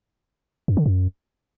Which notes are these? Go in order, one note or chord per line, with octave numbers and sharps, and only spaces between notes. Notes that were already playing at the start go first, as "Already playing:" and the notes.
F#2
D3
F#2